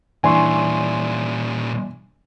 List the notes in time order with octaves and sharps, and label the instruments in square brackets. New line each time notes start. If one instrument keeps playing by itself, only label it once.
[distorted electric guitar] A#2 G3 [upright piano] E3 D4 [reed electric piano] G#5 C6 C#6